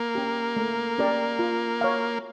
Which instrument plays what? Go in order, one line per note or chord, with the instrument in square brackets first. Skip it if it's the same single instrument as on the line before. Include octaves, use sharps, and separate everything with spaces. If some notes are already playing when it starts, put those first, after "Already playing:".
Already playing: [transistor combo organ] A#3
[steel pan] C#4 G4
A3
C#4 G4 A#4 D5
F4
C#5 F5